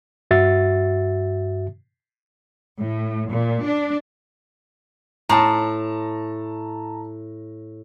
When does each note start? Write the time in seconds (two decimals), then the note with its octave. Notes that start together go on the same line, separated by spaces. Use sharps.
0.31 G2 F#4 E5 A6
2.79 A2
3.30 A#2
3.65 D4
5.29 A2 A5 A#5